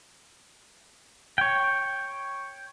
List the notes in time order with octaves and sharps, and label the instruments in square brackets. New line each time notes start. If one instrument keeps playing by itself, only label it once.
[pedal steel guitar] C#5 G5